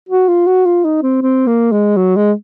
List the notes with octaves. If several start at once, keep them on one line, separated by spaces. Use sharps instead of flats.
F#4
F4
F#4
F4
D#4
C4
C4
A#3
G#3
F#3
G#3